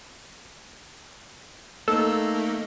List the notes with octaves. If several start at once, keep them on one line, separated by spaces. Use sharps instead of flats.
A3 A#3 D#4 A4